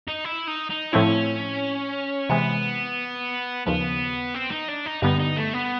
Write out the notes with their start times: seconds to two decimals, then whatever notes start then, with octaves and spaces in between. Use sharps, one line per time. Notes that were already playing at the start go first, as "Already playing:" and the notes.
0.08 D#4
0.25 E4
0.48 D#4
0.70 D#4
0.93 A2 F3 A3 C4 C#4 E4
2.29 C3 E3 G#3 B3
3.66 D#2 C#3 F3 B3
4.34 C4
4.51 D#4
4.68 D4
4.85 D#4
5.02 G2 D3 G3 B3 D#4
5.20 D#4
5.37 A3
5.54 B3